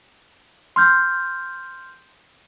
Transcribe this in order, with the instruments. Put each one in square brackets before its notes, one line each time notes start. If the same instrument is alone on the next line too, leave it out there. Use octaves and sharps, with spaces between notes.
[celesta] C6 F6 G6